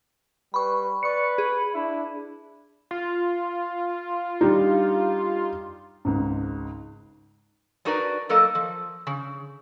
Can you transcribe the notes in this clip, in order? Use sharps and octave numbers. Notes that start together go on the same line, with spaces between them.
G3 B4 B5 C#6
B4 D5 C#6 C#7
G#4 B5
D4 E4
F4
G3 D4 D#4
G#1 C#2 G#2
D4 D#4 F#4 A#4 B4 D5
F#3 A#3 A4 A#4 D#5
F3
C#3